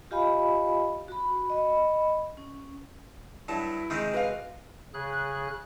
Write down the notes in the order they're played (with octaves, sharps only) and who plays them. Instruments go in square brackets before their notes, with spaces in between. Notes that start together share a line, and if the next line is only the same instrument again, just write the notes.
[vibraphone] F4 G4 D#5 F5 G#5 B5
F#4 B5
D#5 B5
C#4
[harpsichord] G2 F#3 [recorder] E4 [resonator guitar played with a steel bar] A5
[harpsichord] C3 G#3 C4 [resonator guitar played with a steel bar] D#3
[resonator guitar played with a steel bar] F#4 F5 [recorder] B4
[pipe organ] C#3 G#4 F#6